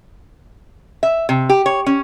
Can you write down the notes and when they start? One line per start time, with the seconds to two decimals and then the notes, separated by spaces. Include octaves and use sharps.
1.03 E5
1.29 C3
1.49 G4
1.66 C#5
1.86 C#4